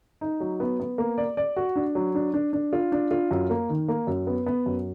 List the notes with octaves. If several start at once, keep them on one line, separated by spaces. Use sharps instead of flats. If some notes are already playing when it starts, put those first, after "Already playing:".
D#4
F#3
B3
B3
A#3
D5
D5
F#4
D4
F#3
D4
D4
D4
F4
D4
F4
F#2
A#3
D#3
A#3
F#2
B3
B3
F#2